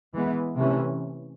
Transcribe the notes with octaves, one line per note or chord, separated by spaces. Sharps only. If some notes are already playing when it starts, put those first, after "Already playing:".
E3 G#3 B3
C3 E3 A3 C#4